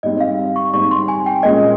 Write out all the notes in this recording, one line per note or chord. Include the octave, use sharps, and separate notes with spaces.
G#2 G3 C4 D#5
F5
C#6
G#2 G3 C4 C#6
C6
G#5
G5
A#2 G#3 C#4 F4 D#5